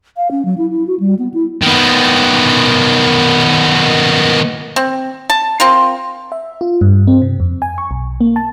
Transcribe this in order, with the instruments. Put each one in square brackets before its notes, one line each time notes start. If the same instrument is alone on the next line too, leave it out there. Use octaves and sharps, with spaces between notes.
[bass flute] F5
C#4
F#3
E4
E4
F#4
G3
B3
E4
[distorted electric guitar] D#3 B3
[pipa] C4
A5
C4 F4 A#4
[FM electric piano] E5
F4
G2
C4
C3
F2
G#5
C#6
B1
A#3
A5